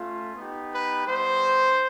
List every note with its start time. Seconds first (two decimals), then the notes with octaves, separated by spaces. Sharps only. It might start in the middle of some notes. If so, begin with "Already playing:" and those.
Already playing: A3 C#4 F4
0.36 B3 D#4 G4
0.72 B4
1.07 G3 B3 D#4 C5